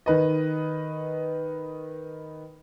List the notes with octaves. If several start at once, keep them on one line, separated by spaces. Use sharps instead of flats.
D#3 B4 D#5